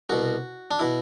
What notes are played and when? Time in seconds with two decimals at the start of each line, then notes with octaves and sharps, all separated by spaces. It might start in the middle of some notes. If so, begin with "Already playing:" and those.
0.09 C2 B2 F#4
0.71 D4
0.79 B2 E4